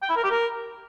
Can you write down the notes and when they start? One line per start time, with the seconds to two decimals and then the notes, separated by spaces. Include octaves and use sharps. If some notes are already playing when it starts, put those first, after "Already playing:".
0.02 G5
0.09 E4
0.16 A#4
0.24 G4
0.31 A#4